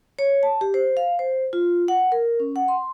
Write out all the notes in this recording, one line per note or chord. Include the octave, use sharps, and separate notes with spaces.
C#5
A5
G4
C5
F5
C5
F4
F#5
A#4
C#4
F#5
C6